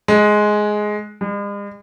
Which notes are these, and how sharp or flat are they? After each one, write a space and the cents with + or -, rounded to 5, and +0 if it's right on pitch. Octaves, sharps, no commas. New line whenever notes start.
G#3 +10
G#3 -45